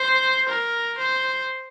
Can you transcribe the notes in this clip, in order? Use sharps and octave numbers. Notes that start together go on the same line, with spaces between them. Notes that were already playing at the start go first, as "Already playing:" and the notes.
Already playing: C5
A#4
C5